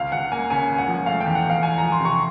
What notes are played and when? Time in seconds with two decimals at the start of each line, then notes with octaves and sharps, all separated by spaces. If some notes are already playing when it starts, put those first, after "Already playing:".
Already playing: C#2 F5
0.12 C#2 F#5
0.32 A#3 G#5
0.50 C#3 G#5
0.70 C#2
0.78 F#5
0.88 F3
1.06 A3 F5
1.21 G5
1.26 E2
1.35 F#5
1.44 E2
1.50 F5
1.63 E2 G#5
1.78 F3 A#5
1.92 C6
2.00 C3 C#6